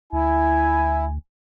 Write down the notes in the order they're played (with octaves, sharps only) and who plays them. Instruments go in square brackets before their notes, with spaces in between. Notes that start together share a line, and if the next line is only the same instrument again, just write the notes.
[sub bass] D2 [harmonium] E4 [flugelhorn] G#5